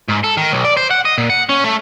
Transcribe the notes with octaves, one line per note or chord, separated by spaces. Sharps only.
G#2
A4
D#3
B1
D5
C5
F#5
D#5
A#2
F#5
C#4
A3